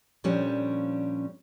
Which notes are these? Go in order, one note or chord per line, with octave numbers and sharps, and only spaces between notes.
A#2 F3 G3 C#4 D4